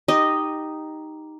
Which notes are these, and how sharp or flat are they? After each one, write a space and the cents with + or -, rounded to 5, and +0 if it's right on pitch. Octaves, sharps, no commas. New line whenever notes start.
D#4 +0 G4 +0 D#5 -5